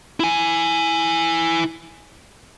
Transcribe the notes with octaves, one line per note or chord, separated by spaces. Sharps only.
E4 G#5